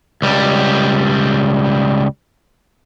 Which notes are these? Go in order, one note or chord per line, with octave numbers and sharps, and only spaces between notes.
C#2 G3